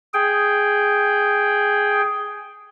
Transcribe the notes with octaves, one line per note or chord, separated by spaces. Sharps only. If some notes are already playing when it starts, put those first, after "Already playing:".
G#4 G5